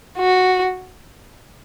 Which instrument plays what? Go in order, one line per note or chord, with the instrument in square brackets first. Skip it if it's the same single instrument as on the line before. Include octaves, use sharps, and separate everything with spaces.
[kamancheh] F#4